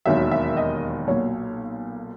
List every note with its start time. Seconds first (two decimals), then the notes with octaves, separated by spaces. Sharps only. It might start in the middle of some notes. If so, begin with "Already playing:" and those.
0.06 E1 D#2 D#3 F#3 E5
0.31 E5
0.57 D#5
1.07 B1 A#2 F#3 C#5